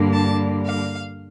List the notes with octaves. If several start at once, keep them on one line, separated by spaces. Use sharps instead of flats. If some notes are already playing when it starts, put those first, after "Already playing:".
Already playing: G2 D3 G3 A#3
A5
F5